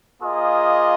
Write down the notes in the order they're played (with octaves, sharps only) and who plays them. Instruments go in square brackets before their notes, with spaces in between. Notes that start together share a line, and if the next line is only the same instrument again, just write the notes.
[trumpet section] A#3 F4 G#4 D#5